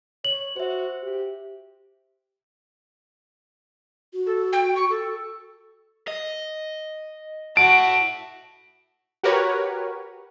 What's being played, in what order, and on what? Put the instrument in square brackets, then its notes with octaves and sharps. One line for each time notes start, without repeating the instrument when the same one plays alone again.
[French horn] C#5 [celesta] F#7
[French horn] F#4 [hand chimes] C5 E5
[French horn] G4
[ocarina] F#4
[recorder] A4
G5
C#6
A4
[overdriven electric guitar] D#5
[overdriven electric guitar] E4 A5 [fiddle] F#4 [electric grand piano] D7
[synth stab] F#4 G4 A#4 B4 C#5